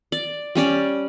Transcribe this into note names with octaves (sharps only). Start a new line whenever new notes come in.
D5
G3 C#4 D5